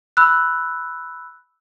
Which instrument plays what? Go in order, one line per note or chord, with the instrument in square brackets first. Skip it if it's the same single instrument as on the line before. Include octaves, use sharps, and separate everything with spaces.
[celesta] B5 E6 F#6